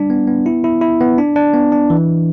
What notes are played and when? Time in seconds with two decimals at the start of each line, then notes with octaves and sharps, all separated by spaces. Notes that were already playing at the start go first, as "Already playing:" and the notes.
Already playing: G3 D4
0.10 B3
0.27 B3
0.46 E4
0.64 E4
0.82 E4
1.00 B3
1.18 D4
1.36 D4
1.54 B3
1.72 D4
1.90 E3